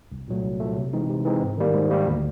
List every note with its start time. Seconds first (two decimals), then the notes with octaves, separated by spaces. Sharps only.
0.12 C2
0.28 A#2 F#3 A3
0.44 C2
0.60 A#2 F#3 A3
0.77 C3
0.93 E3 G#3 C4 D#4
1.09 C3
1.25 E3 G#3 C4 D#4
1.42 G#2
1.57 D#3 G3 A#3
1.74 G#2
1.90 D#3 G3 A#3
2.06 D2